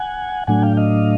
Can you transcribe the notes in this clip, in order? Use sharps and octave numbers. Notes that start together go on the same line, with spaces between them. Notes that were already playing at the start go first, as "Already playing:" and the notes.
Already playing: F#5 G#5
A2 F#3 A3 D4 F#5 G#5
F5 G5
D#5 F5